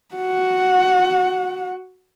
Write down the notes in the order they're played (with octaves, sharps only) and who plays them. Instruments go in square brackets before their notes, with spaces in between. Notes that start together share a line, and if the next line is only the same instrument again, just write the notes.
[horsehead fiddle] F#4 F#5